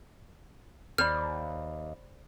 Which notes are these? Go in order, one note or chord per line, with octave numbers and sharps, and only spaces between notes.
D#2 C5 D5 B5 F6